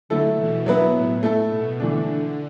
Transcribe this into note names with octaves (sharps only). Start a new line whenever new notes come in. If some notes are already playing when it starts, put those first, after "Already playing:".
D3 F#3 A3 E4 A4
B2 E3
D3 F#3 B3 E4 B4
A2
A3 E4 A4
B2
D3 E3 A3 D4